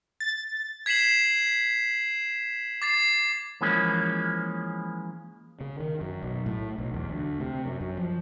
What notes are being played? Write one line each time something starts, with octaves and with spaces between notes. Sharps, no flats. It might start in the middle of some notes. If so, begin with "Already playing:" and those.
A6
G#6 B6 C7 E7 F#7
D6 A6 C7
E3 F3 G#3 A#3 C#4
C#3
D#3
F#2
B1
A2
B1
E2
D2
C3
F#2
F#2
F3